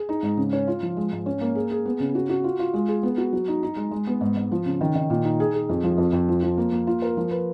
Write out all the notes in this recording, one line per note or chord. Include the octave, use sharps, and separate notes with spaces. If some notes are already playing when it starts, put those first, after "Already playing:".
Already playing: G#4
D#4
G#2
C#3
C#4
F4
F3
G#3
G#2
C#4
A#3
G#4
G#4
B3
C#3
F#4
F#4
F4
F4
G#3
G#4
B3
F#4
F#3
D#4
D#4
G#3
G#3
B3
G#2
G#2
F3
C#3
D#3
D#3
A#2
D#4
G#4
G#4
F2
F3
F2
F2
F3
F3
A#3
A#3
F4
A#4
F3
B4